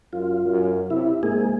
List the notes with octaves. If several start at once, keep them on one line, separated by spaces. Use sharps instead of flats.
F#2 F4
F#2
C3 E4
G#2 A#3 G#4